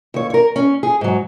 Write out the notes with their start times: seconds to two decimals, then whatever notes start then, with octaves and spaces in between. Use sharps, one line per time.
0.14 D#2 C#5
0.30 A#4 C#5
0.56 C#4
0.83 G#4
1.01 G#2 F#3